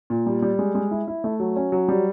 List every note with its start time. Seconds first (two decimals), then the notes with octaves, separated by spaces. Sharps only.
0.10 A#2
0.26 G3
0.42 G3
0.59 G#3
0.75 G#3
0.91 E4
1.08 E4
1.24 A3
1.40 F#3
1.56 C#4
1.72 F#3
1.88 G3